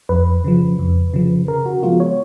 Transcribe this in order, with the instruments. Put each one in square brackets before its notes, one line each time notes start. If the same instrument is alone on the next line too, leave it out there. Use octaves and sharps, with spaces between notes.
[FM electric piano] F2 B4
C#3 F3
F2
C#3 F3
C#3 A#4
F#4
F3 G#3 B3 F4
C#5